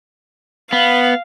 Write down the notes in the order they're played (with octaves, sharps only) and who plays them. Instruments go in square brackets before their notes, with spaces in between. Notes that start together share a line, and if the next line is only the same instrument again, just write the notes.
[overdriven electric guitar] B3 [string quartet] F5